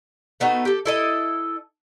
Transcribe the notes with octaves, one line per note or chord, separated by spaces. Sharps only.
A3 B3 D#4 F#4
G4 A4
E4 A4 D#5